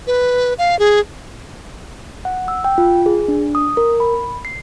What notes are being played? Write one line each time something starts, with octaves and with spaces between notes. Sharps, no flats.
B4
F5
G#4
F#5
E6
G5
F4
G#4
D4
D#6
A#4
B5
C7